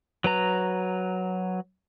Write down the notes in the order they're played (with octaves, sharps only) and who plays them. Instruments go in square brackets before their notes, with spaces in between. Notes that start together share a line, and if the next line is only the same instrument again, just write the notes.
[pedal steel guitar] F#3 B4 A#5